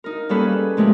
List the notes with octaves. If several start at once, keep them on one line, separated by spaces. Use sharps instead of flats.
D#4 A#4
G3 A#3 C#4 G#4 A4 B4
A#2 F3 G#3 A3 G4